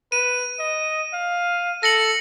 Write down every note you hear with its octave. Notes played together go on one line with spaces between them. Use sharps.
B4 D#7
D#5
F5
A4 A#6 C#7 F#7